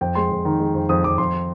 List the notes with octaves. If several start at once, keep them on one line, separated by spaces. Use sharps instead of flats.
F2 G5
G#3 C6
F2
D#3
G#3
F2
F2 D#6
F2 D6
F2 C6